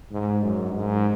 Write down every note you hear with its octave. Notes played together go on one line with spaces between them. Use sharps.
G#2
F#2
G#2